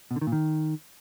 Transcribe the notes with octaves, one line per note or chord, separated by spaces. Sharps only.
B2
D3
D#3
A#2
D#3